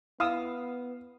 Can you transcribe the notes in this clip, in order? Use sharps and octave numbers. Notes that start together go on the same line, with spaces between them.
B3 E4 F5 D#6 E6